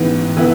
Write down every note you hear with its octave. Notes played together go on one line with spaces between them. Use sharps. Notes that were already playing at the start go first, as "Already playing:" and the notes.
Already playing: A1 G#2 E3 B3
E3 B3 E4